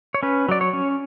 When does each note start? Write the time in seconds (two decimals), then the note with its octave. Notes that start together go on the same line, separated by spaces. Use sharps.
0.14 C#5
0.23 C#4 B4
0.49 F#3 D5
0.61 C#5
0.73 C#4